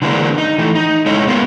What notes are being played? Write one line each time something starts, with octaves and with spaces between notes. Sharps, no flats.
D3 E3 G#3 A#3 D4
D#4
E3 A3
D#4
G#3 A3 E4 C#5 D#5
G#3 A#3 B3 E4 F4